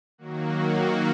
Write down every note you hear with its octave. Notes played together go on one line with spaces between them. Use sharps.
D#3 F#3 A#3 F#4